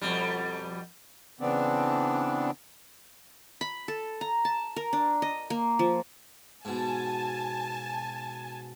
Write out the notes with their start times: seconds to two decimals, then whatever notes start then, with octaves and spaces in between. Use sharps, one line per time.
0.01 F2 B2 G3
1.40 C#3 E3 B3 C4 D4
3.61 B5
3.88 A4
4.21 A#5
4.45 A5
4.76 A#4
4.93 D4
5.22 D#5
5.50 A#3
5.79 F3
6.65 G#2 B2 G#5 A5